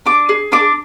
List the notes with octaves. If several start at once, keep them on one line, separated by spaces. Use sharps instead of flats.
D4 D6
G#4
D4 D6